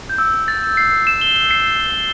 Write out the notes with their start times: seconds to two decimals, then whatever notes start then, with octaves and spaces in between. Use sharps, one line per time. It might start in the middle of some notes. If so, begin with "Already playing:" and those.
0.09 G6
0.18 E6
0.48 A6
0.77 C7
1.07 E7
1.21 G7
1.36 E7
1.51 C7